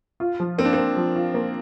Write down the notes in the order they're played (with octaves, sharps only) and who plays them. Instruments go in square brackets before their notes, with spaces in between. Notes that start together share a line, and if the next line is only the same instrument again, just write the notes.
[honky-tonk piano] F4
F3
[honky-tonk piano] A#3 [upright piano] C4
[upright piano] D4
[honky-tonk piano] A#3 [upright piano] C4
[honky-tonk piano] F3
F4
A#3